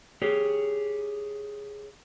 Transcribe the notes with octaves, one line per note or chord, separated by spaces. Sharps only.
G4 G#4 C#5